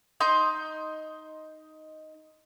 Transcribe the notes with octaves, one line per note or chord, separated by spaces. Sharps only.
D#4 C6 G6